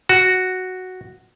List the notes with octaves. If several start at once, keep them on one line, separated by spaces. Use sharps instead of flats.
F#4